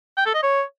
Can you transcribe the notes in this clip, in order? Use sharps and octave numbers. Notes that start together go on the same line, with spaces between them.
G5
A4
D#5
C#5